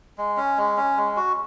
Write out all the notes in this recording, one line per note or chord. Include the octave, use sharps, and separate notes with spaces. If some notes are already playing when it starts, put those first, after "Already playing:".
G#3
C#4
G#3
C#4
G#3
F#4